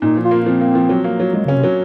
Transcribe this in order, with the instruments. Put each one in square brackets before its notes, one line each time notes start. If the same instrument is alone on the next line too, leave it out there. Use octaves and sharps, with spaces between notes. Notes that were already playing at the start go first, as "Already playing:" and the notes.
[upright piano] A#2 [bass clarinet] D#4
[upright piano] F3
[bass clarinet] F4
[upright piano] A#3
[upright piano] F3 [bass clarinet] C4
[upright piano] A#3
F3
F#3
A#3
F#3
[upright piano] F#3 [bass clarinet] G#3
[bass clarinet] C#3
[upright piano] C#4
[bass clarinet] C3
[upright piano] F#3